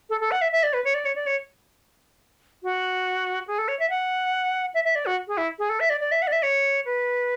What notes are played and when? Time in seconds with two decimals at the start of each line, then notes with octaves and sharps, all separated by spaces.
0.10 A4
0.21 A4
0.31 F#5
0.41 E5
0.52 E5
0.63 D5
0.73 B4
0.84 C#5
0.94 D5
1.05 C#5
1.15 D5
1.26 C#5
2.63 F#4
3.47 G#4
3.58 A4
3.68 C#5
3.79 E5
3.90 F#5
4.74 E5
4.84 E5
4.95 D5
5.06 F#4
5.27 G#4
5.37 E4
5.59 G#4
5.69 A4
5.80 E5
5.90 D5
6.00 D5
6.11 E5
6.22 F#5
6.27 D5
6.32 E5
6.43 C#5
6.85 B4